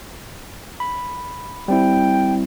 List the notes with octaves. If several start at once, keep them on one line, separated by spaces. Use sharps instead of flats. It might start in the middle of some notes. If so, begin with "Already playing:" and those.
B5
G3 C4 E4 G5